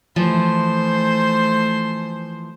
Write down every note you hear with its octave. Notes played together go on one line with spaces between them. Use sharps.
E3 F3 A3 C5